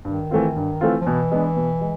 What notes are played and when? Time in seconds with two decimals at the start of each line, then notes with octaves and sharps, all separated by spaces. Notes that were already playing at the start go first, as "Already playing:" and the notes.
0.05 G2 D#3
0.31 E3 A3 C4 F4
0.56 G2
0.81 E3 A3 C4 F4
1.01 F3
1.06 B2 E3
1.32 G#3 B3 D4
1.56 B2
1.81 G#3